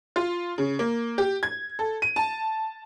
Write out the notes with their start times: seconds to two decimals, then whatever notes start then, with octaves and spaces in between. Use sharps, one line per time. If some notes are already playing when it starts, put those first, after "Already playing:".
0.16 F4
0.58 C#3
0.79 A#3
1.18 G4
1.43 G#6
1.79 A4
2.02 D#7
2.16 A5